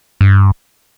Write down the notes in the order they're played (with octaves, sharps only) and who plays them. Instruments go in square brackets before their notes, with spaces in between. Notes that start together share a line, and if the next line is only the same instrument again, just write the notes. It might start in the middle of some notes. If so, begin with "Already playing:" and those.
[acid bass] G2